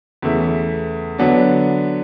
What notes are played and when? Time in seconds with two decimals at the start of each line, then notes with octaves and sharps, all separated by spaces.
0.22 E2 C#3 E3 A3 E4
1.18 D3 F#3 B3 D4